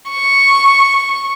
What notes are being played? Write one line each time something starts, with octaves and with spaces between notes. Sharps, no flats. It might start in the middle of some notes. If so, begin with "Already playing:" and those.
C#6